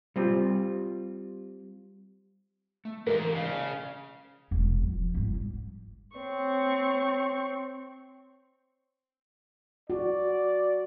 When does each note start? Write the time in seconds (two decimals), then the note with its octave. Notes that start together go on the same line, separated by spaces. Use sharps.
0.16 G3 C4 F4
2.85 A3
3.07 G#2 E3 G4 A#4 F5
3.35 C#3 C5 D5 F5
4.51 E1
4.83 F3
5.14 G1 G#2
6.16 C4 C#5 C#6
9.90 F#4 D5